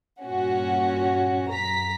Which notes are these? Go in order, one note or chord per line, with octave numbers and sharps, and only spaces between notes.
G2 A#2 C#4 F#4
F#2 A#5 B6